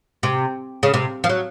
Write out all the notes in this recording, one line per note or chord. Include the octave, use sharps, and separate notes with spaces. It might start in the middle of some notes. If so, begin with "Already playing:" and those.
C3
C#3
C3
F3
F#3